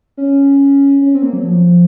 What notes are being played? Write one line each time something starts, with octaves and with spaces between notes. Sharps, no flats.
C#4
C#4
C4
A#3
F#3
F3